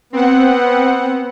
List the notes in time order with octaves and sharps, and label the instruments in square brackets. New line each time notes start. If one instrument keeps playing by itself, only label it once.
[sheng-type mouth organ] B3 [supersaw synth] C4 F#5